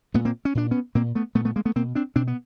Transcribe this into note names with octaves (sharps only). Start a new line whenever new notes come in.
A#2 A3 B3
A#3 C4
C#4
A#2 D4
B3 C#4
A#2 A#3 C4
A3 B3
A#2 A3 B3
A3 B3
G#3 A#3
A3 B3
B2 A#3 C4
C4 D4
B2 C4 D4
B3